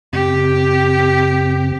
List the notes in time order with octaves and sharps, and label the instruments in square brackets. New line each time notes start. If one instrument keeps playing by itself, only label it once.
[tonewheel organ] F#2 C#3 C4 [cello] G4